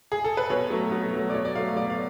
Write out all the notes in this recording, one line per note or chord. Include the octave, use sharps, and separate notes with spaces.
G#4
A4
B4
B2 C#5
F#3 A3
B2
F#3 A3
D5
B2 C#5
D5
F#3 A3 F5
B2 D5
F5